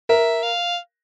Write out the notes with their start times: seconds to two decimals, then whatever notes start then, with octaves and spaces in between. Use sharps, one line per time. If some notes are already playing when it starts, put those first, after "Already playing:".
0.09 A#4 E5
0.43 F5